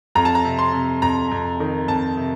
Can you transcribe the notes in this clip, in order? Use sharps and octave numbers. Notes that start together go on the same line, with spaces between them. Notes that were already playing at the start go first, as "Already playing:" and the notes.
F2 A#5
A5
A#5
C3
C6
C3
F2 A#5
F2
D#3
F2 A5
C3